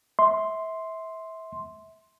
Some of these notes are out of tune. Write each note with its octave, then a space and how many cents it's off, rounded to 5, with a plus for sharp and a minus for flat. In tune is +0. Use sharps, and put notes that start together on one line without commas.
E5 -25 C6 +0